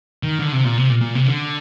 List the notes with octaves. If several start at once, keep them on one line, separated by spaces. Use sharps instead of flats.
D#3
D3
C3
A#2
C3
A#2
A#2
C3
D3